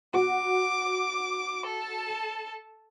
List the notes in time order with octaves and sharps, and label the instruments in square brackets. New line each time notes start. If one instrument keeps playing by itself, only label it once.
[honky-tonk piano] F#4 [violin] D6
[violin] A4 A5